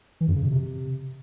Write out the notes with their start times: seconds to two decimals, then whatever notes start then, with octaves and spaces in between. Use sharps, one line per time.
0.21 E3
0.28 F#2
0.36 C#3
0.43 B2
0.51 C3